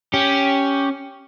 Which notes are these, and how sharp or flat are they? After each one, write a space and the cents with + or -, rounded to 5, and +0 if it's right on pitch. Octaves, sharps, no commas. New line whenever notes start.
C#4 +5 G4 +0